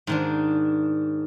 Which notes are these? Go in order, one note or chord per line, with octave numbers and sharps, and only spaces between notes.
G#2 D#3 D4